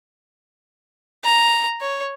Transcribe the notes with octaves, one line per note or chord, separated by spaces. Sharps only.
A#5
C#5